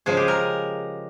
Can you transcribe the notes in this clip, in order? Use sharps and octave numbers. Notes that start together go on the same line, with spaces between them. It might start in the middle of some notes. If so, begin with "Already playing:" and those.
C#3 F3 G#3 G#4
G4
A#4